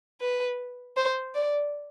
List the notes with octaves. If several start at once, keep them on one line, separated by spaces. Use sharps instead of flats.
B4
C5
D5